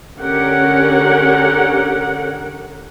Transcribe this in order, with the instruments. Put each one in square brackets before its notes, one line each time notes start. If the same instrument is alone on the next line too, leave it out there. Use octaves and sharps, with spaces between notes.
[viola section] D3 C#4 G4 A#4 F#5